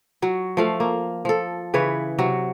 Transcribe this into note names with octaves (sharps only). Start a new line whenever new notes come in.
F#3 F#4
F3 A3 F5
A#3
F3 A4
C#3 E3 B4 C#5
C3 F#3 F#4